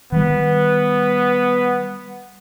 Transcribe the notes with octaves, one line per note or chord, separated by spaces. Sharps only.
D#3 G3 B3